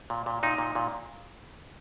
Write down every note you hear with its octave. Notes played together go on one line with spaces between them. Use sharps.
A#2
A#2
A#2 D#4
A#2
A#2